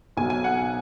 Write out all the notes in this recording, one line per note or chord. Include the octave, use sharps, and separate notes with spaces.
B1 B2 F#3 G#5
G#5
F#5